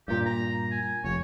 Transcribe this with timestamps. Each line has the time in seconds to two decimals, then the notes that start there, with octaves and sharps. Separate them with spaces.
0.08 G2 A#2 G4
0.26 A#5
0.71 G#5
1.04 F1 C#5